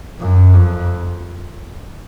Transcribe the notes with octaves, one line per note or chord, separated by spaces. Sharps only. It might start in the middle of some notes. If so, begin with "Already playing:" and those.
F#2
F2